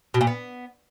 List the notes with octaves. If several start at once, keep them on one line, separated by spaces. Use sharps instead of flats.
B2
A#2
B3